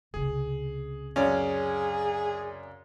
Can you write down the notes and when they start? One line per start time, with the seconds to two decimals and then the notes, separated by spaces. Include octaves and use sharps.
0.14 C#2 C3 G#4
1.16 F#2 C#4 G#4 D5 F5